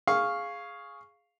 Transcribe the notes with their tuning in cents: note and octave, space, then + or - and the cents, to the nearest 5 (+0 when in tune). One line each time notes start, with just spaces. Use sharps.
G#4 +0 F5 +0 C#6 +0